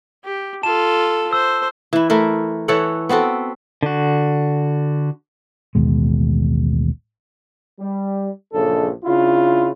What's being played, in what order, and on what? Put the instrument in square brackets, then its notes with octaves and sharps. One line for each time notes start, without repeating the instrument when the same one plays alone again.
[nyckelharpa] G4
[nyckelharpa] F4 A4 [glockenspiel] A5 E7
[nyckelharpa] C5 [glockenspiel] E6
[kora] E3 E4
A3 E4 A#4
E3 A4 C#5 F#5
B3 C4 F#4 A4
[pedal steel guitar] D3 F#4
[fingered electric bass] A1 D#2 B2 G#3
[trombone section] G3
A#1 F#2 C#3 D4 A4
C#3 D4 E4 F4